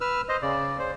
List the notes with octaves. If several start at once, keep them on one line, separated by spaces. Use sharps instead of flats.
B4 E6 F6
C5 D#5
C#3 D5
C5